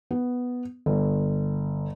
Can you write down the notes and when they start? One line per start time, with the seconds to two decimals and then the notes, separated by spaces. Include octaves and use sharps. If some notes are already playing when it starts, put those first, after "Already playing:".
0.11 B3
0.86 G1